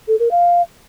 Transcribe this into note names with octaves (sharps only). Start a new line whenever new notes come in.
A4
A#4
F5